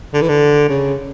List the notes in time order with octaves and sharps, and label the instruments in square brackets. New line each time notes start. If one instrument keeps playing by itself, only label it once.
[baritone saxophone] D3
E3
D3
C#3